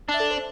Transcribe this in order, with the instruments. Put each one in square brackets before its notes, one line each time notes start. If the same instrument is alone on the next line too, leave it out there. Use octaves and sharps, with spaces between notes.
[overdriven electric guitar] D4
[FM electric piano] E5
A4 D5
C5